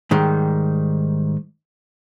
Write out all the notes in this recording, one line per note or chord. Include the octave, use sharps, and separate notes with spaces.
G#2 D#3 G3